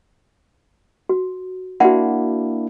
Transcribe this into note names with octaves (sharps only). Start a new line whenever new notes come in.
F#4
A#3 D4 E4 F#4 F#5